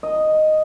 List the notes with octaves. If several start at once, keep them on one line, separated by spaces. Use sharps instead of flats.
D#5